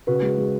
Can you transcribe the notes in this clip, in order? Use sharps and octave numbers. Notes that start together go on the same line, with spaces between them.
C#3 F#4 B4
G#3
G#3